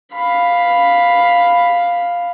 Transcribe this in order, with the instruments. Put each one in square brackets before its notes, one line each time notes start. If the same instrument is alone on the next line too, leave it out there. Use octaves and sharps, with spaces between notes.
[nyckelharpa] F5 B5